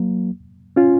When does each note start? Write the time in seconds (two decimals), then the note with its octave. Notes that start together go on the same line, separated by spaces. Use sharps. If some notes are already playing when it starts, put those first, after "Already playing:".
Already playing: F#3 A#3
0.76 C#4 F4